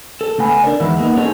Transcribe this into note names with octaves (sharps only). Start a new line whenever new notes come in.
A4
C#3 A3 B3 G#5 B5
D4 A#4 D5
E2 D#3 G#3 B3 E4
A#3 B3 D#4
C#4 D#4 G#4 A4 C5 C#5